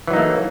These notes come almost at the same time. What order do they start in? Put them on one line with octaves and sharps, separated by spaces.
E3 F#3 D#4 A#3 A3